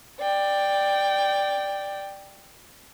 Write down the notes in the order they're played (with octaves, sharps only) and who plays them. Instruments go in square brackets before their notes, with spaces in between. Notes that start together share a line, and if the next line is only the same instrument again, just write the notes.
[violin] D5 G5